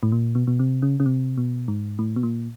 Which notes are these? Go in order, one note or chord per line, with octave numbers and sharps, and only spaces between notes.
A2
A#2
B2
B2
C3
C#3
C#3
C3
B2
G#2
A2
B2
A#2